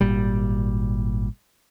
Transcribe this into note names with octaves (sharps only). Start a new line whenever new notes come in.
G#1 A#2 G3